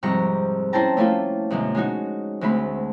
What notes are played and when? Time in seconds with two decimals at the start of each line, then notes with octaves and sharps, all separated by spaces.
0.03 F2 G#2 C3 G3 A#5 C#6
0.73 C#4 E4 C5 G5 A5 A#5
0.97 A3 A#3 C#4 E4 F4 A4
1.50 F#2 B2 D3 G#3
1.75 G#3 C#4 D#4 F#4
2.41 D2 G#3 A3 C4 B5